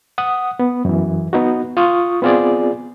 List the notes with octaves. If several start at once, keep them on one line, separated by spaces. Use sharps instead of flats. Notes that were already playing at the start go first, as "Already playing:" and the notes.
F#5 D#6
B3
F#2 E3
B3 D#4 F#4
F4 C#6 D#6
B3 C4 F4 G#4 D5